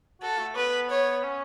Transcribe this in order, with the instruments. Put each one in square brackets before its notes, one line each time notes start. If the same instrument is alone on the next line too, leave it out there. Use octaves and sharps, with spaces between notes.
[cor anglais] F#4 [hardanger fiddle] A4
[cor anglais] A3
[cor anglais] B3 [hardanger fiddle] B4
[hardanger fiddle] C#5
[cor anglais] C#4